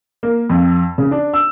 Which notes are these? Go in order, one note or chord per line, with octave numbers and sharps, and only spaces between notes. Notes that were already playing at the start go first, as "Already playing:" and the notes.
A#3
F2
C#3
D4
E6